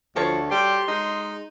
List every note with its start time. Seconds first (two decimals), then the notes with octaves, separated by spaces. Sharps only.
0.16 D2 F3 F#4 A4 C#5
0.51 G3 G4 C6
0.88 G#3 D#4